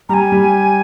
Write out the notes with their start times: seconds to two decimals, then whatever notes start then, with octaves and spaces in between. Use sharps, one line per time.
0.09 G3 G#5 A#5
0.32 G3